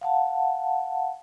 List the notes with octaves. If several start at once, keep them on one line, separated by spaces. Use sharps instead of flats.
F5 F#5 A5